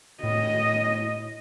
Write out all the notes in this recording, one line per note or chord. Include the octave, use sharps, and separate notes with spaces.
A2 D#5